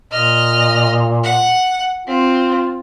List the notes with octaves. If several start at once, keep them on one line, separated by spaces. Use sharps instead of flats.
A#2 D#5 F6
F#5
C4 F4